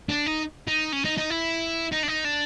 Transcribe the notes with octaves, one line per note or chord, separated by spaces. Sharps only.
D4
D#4
D#4
C#4
D#4
D#4
E4
D#4
D4
D#4
D4